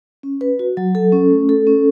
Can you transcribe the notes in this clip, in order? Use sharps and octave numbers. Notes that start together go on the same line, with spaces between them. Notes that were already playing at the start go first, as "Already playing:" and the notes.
C#4
B4
F#4
F#3
A4
C#4
A3
A4
C#4